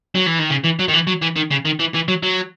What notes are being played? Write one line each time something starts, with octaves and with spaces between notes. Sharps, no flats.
F#3
E3
D#3
C#3
E3
F#3
D#3
E3
F#3
E3
D#3
C#3
D#3
E3
E3
F#3
F#3